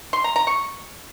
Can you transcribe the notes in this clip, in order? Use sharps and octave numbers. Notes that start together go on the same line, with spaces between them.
C6
A#5
A#5
C#6